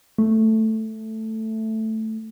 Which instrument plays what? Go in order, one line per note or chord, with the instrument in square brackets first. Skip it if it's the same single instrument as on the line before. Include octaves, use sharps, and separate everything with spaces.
[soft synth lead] A3